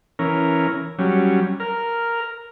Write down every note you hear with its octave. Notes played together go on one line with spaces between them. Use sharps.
E3 C#4 A#4
F#3 G3 C#4
A#4 F6